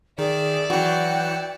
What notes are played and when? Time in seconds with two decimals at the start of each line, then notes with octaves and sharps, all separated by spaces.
0.18 D#3 G#4 D5 E5
0.70 E3 F#3 F#4 G5 C#7